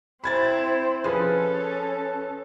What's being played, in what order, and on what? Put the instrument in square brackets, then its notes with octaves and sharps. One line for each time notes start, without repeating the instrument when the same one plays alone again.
[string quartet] C4 E4 C5 [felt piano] B5 G#6 A6
[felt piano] F3 G#4 B4 [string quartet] C#4 A4